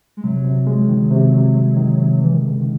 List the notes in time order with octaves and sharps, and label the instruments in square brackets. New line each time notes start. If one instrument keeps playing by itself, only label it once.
[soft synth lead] G#3
[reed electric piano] C3 [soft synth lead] F#3
[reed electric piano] C3
G#3
D#3
C3
C3
G#3
D#3
C3
[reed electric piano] C3 [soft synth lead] E3
[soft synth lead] D#3
[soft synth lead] C#3 [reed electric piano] G#3
[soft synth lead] D#3